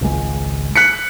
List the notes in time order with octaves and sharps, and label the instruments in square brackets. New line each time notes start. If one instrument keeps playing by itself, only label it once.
[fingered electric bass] G#1 C#2 G#3
[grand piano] F#6 B6 C#7